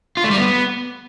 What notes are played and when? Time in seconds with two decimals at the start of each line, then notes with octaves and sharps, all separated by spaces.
0.17 F4
0.24 A3
0.31 G3
0.38 B3